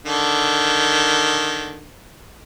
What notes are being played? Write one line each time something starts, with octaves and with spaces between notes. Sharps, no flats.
D3 D#3